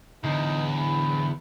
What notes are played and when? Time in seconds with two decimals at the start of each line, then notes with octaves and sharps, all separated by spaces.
0.24 E2 D3 F#3 D#4
0.73 B5